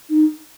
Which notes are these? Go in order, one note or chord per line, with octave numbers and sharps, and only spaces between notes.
D#4